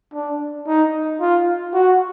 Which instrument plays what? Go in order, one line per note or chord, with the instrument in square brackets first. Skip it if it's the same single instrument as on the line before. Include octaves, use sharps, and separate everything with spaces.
[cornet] D4
D#4
F4
F#4